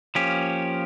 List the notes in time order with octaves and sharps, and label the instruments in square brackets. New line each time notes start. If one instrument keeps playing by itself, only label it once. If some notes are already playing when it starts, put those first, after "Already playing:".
[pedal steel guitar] F3 A#3 C#4 G4